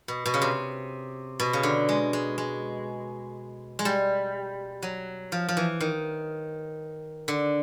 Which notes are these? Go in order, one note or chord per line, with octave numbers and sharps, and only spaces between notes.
B2
B2
C#3
C3
B2
C#3
D3
G#3
G#3
G#3
G#3
G3
F#3
F3
F3
E3
D#3
D3